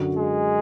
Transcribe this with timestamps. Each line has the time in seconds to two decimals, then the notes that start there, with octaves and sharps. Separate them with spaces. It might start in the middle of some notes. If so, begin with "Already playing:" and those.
Already playing: F#2 D3 F#3
0.17 G#3